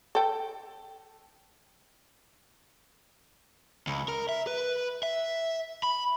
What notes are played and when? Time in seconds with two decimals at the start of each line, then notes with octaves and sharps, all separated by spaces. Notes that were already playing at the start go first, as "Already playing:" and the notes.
0.15 A4 G5
3.87 C#2
4.08 A#4
4.29 E5
4.47 B4
5.03 E5
5.83 B5